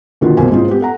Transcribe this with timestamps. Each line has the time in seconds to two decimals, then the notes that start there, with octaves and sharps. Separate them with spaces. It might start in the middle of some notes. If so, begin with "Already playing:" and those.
0.21 A#2 D3 D#3 B3 F4 F#4
0.37 B1 B2 A#3 C5 G#5
0.51 G#2 G#3 C4 C#4 F4
0.68 B3 G4
0.81 A4 F#5 A#5